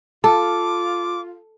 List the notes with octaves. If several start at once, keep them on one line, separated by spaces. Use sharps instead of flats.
F4 A4 A5 D6